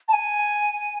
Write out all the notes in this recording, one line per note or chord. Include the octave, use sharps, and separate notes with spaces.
A5
G#5